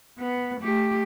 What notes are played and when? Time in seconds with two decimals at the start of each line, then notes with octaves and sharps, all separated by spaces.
0.19 B3
0.61 A3 G4